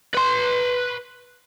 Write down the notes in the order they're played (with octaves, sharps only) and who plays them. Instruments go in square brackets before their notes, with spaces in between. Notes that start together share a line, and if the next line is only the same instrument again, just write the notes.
[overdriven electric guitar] B4 C6